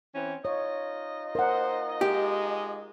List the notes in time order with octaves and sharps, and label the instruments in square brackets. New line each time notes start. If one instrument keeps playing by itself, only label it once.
[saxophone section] E3 C4 C#4
[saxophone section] D#4 F4 D#5 [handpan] C#5
[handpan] A#4 F#5 [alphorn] C5
[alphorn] G#3 [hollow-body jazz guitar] G4